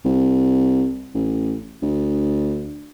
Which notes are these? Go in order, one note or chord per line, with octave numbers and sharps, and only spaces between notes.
C2
A1
D2